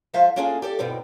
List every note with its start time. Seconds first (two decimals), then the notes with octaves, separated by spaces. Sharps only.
0.14 F3 G#3 F4 C5 E5 F5
0.36 A#3 C#4 D4 F4 G#4 A4
0.62 G4 A4 D5
0.79 D2 G2 B2 C4 D#4